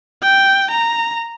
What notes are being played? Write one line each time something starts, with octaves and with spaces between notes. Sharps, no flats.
G5
A#5